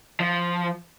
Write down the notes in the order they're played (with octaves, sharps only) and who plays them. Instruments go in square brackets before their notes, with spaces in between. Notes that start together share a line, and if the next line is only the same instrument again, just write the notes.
[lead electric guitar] F3